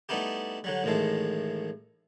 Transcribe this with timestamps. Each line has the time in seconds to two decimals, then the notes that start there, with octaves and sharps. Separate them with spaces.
0.09 G3 A3 B3 D#4 E4 G4
0.64 D3 F#3 G3
0.84 A1 A2 D#3 G#3 A4